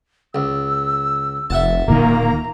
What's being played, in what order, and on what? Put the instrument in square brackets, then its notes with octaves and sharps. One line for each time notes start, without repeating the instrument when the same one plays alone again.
[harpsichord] C#2 [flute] E6
[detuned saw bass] F1 [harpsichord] E5 F#5 A5
[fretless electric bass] D1 A#2 D#3 [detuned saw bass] A#3 [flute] A#5